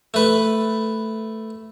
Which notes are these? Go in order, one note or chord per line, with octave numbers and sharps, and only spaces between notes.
A3 B4